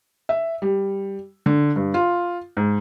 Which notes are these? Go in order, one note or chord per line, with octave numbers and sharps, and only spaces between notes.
E5
G3
D3
G2
F4
G#2